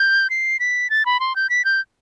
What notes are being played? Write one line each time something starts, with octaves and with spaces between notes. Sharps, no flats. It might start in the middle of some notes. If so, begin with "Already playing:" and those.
Already playing: G6
C7
B6
A6
B5
C6
G6
B6
G6